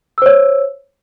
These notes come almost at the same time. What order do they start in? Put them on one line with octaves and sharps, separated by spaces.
E6 C5 C#5